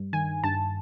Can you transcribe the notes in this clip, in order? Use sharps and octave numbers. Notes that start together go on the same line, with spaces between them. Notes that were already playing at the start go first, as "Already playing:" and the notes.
Already playing: G2
D#3 G#5
G2 A5